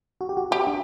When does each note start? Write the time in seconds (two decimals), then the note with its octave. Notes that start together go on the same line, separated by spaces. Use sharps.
0.21 F#4
0.29 G4
0.37 F#4
0.51 F#4 G4
0.67 D4